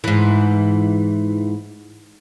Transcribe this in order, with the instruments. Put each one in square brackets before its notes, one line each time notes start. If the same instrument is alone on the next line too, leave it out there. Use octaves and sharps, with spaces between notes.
[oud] G#2 E3